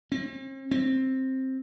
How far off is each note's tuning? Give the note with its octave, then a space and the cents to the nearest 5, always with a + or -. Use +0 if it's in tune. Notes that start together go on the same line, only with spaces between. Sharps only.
C4 +45
C4 +10